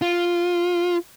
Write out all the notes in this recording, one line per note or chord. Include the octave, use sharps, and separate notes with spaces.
F4